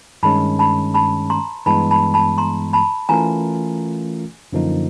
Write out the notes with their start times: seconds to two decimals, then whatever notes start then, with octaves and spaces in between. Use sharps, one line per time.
0.23 G2 D#3 G#3 C#4 A5 B5
0.59 A5 B5
0.94 A5 B5
1.30 A#5 C6
1.66 G2 E3 G#3 B3 A5 B5
1.91 A5 B5
2.14 A5 B5
2.38 A#5 C6
2.73 A5 B5
3.09 E3 A3 C#4 F4 A#4 G#5 A#5
4.53 F#2 D3 F3 A#3 D#4